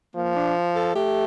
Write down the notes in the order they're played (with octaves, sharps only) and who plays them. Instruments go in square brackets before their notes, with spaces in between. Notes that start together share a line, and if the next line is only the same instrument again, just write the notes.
[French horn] F3 [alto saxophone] A#3
[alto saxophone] D4
A4
[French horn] A3 [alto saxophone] G4